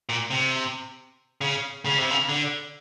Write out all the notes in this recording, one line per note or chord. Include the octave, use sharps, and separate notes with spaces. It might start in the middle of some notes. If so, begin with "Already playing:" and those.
A#2
C3
C#3
C#3
C3
C#3
D3